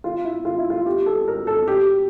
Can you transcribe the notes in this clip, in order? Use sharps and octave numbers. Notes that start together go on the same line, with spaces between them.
F4
E4
F4
E4
F4
G4
A4
A#4
A4
G4